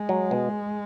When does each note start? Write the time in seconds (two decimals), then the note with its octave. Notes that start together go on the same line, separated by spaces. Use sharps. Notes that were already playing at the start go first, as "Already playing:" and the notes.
Already playing: G#3
0.09 F#3
0.31 B2